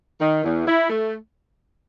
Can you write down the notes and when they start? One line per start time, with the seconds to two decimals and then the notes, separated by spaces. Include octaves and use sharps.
0.21 D#3
0.43 E2
0.67 E4
0.90 A3